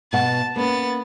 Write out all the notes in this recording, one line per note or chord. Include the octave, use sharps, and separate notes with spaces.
B2 F#5 A5
A#3 B3 C#4 A6